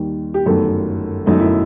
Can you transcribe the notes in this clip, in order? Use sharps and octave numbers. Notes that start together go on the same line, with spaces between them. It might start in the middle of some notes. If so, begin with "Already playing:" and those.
Already playing: D#2 D#3 G3
G4
G1 F#2 D#3 A3 A4
G1 F#2 D#3 A3 D#4
E4